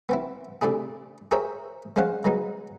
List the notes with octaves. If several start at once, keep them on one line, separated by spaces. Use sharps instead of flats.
B3 C4 E4
C3 A3 D4 E4 G#4
G#4 A#4 C5 C#5 E5 G5
G#3 C#4 C5 F5 F#5
F#3 G#3 B3 D#4